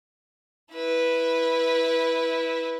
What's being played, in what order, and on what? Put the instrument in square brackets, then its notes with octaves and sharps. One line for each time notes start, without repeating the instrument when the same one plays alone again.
[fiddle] E4 B4